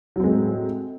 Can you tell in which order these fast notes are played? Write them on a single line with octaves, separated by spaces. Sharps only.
F#3 C4 G#3 A2